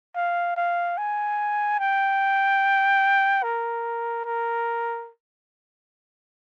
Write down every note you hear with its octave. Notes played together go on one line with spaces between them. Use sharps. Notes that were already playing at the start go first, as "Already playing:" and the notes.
F5
F5
G#5
G5
A#4
A#4